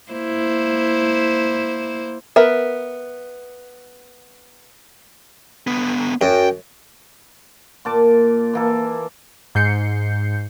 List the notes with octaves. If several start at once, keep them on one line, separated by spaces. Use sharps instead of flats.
A#3 E4 C5
B3 A#4 B4 E5
D3 B3
F#2 G5
A#2 A5 D6
E3 A#3 A4
G#2 G6 C7 C#7